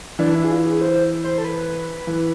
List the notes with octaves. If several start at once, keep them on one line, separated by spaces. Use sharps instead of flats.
E3 D4
E4
G#4
F4
G#4
C5
C5
A4
B4
E3